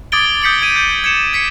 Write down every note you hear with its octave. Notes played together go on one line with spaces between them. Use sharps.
D6 D#6 G#6 A6 D7 G7
D#6 G6 B6 C#7 F#7 G7
G#6 D#7
G6
G#6 C#7 E7
G#6 B6 C#7